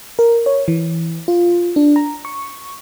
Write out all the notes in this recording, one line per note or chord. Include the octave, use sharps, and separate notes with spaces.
A#4
C#5
E3
F4
D4
A#5
C#6